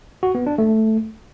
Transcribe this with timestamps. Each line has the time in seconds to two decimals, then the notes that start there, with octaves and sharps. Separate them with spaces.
0.23 F#4
0.35 B3
0.47 D4
0.58 A3